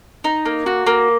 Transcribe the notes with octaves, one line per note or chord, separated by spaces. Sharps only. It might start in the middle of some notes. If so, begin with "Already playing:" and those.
D#4
A#3
F#4
A#3